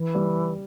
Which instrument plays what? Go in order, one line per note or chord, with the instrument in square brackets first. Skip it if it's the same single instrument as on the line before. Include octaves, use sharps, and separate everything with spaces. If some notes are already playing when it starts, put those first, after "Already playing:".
Already playing: [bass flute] E3
[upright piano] G3